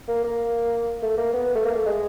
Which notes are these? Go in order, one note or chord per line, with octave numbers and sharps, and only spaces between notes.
A#3
A#3
A3
A#3
B3
A3
A#3
A3
G#3